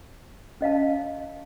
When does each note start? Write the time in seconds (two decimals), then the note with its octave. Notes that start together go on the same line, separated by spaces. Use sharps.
0.61 C#4 D#5 F5 A5